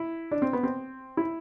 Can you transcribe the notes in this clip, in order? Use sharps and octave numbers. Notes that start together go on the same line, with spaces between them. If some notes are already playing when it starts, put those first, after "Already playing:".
Already playing: E4
D4
C4
B3
C4
E4